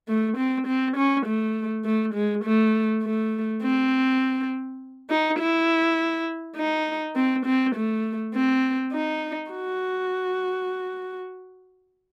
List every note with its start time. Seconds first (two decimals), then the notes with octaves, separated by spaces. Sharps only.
0.08 A3
0.37 C4
0.67 C4
0.97 C#4
1.26 A3
1.85 A3
2.14 G#3
2.44 A3
3.03 A3
3.62 C4
5.10 D#4
5.39 E4
6.56 D#4
7.15 C4
7.46 C4
7.76 A3
8.35 C4
8.93 D#4
9.51 F#4